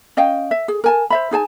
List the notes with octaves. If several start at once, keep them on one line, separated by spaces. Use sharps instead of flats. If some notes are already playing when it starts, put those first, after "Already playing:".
C#4 D#5 F5 G5
E5
G#4
A#4 G#5 A5
C5 E5 B5
D#4 G#4 G#5 A5